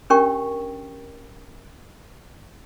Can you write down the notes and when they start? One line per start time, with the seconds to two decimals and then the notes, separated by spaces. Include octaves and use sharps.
0.10 C#4 D4 G4 A#4 G5 C#6